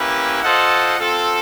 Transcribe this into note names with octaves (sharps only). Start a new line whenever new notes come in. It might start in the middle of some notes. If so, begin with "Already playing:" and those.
Already playing: A#3 C#4 E4 G4 B4
F4 A4 C5 D#5 F#5
C4 F4 A4